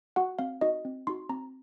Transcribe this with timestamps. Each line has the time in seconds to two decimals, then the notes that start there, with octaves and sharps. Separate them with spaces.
0.16 F#4 F#5
0.39 C4 F5
0.61 D#4 F#4 D#5
0.85 C4
1.07 D#4 F#4 C6
1.29 C4 A#5